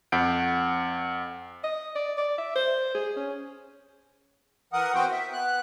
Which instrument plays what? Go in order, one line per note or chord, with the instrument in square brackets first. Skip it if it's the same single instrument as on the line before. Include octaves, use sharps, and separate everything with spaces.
[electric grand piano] F2 F#5 G6 D7
[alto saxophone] D#5
D5
D5
E5
C5
G#4
C#4
[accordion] E3 A#4 F#5 D#6
B3 C4 F#4 C5 G5
E5
B3 F#6